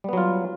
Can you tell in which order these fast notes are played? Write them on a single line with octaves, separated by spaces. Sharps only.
G3 B3 F#3 F4